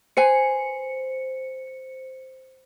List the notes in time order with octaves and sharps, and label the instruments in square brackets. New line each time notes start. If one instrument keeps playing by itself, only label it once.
[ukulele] B4 G#5 [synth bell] C5 C#7